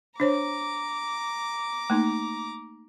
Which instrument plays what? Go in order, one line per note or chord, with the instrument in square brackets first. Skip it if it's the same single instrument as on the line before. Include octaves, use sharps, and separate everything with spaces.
[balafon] D4 C5 C#5 [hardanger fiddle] A#5 D6
[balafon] A3 A#3 D#4